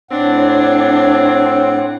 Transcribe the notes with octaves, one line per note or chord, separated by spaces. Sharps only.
A2 C4 D4 C#5 F#5